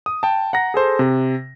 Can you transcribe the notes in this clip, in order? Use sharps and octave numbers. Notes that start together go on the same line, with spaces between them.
D#6
G5 A5
F#5 A#5 A#6
G#4 A4 C5
C3